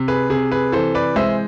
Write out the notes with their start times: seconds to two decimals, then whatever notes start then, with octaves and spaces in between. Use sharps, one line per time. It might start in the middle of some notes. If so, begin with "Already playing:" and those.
Already playing: C3
0.08 G#4 B4
0.30 C3 G#4
0.51 G#4 B4
0.72 E3 A4 C5
0.95 B4 D5
1.16 G#3 C5 E5